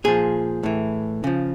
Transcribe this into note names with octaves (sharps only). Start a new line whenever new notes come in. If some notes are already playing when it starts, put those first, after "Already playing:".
A#2 F3 G#4
A2 E3
C#3 F3